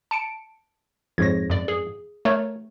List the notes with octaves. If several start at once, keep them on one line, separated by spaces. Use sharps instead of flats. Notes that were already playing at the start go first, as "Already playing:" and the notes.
A5 C#7 D7
F2 G#2 C#5 G#6 A#6
F#2 D5
G#4
A3 A#4 C#5